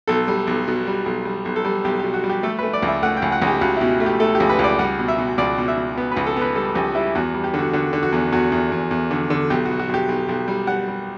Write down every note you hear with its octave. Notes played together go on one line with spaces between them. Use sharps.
B1 A4
G3
B1
B2
G3
B1
G3
B1
A4
G3
B1 G4
G4
B2
F#4
G3
G4
A3 A4
B4
A3
D5
C#2
E5
A3 F#5
G5
C#2
F#5
C#2
G4
C#2 F#4
E4
B2
A3
G4
A3 A4
G4
C#2
B4
C#2 D5
G3 F#5
B2
E5
B2
C#2 D5
B2
E5
B2
B3
B4
C#2
A4
B3
B4
G3 A4
C#2 G4
G3 E4
E2 F#4
G3
G4
D3
F#4
D3 F#4
D3
F#4
E2
E2 F#4
E2
E2
E2
D3
D3
B1 G4
F#4
B2
F#4
B1 G4
B1
B1
G3
G3 F#5
G3